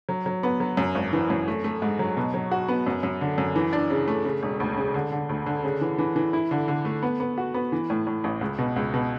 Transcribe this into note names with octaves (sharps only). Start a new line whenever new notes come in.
F#3
F#3
B3
F#3
F#2
G#1
E3
F#2
A3
A3
G#2
F#3
B2
F#3
F#4
B3
F#2
F#2
D3
F#2
E3
D4
C#3
A3
C#3
E1
D2
C#3
D3
D3
D2
D3
C#3
E3
E3
E3
E4
D3
D3
A3
B3
B3
F#4
B3
E3
A2
A2
A1
C#2
B2
C#2
B2